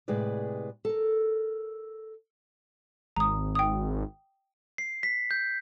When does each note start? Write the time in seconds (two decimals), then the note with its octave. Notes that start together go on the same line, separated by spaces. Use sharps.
0.08 A2 C3 G#3 G#4 B4 D5
0.85 A4 A#4
3.16 G#1 A#5 D#6
3.55 G5 D#6
4.78 C7
5.03 B6
5.31 G6